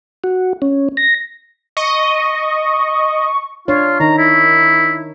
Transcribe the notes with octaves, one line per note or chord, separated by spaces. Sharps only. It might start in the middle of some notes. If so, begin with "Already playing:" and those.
F#4
C#4
A#6
D#5 C#6
D4 F4 C#5
D#3 D#4 A#5
E4